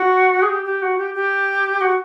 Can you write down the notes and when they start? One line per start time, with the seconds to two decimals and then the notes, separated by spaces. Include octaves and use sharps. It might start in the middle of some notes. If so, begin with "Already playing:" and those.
Already playing: F#4
0.42 G#4
0.50 G4
0.65 G4
0.82 F#4
0.98 G4
1.15 G4
1.81 F#4